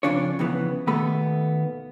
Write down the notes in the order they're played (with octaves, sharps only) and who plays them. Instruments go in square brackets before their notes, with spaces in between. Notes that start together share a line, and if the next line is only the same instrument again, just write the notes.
[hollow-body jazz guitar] F2 G#2 C#3 D4 F4 C#5
F2 C#3 E3 B3
D#2 B2 A3 B3 B5